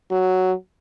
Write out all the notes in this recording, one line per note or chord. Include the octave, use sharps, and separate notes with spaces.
F#3